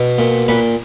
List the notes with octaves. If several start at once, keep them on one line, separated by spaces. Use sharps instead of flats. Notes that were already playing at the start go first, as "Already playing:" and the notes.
Already playing: B2
A#2
A#2 B4